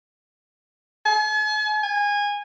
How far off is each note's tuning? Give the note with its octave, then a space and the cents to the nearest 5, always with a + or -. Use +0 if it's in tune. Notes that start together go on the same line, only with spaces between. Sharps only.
G#5 +45
G#5 -20